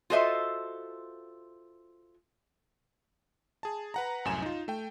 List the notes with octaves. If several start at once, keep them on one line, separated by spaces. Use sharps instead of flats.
F4 F#4 A4 C5 D#5 E5
G#4 A5
B4 F#5 A#5
C2 F#2 A2 G#5 E7
D#4 F4
A3 G5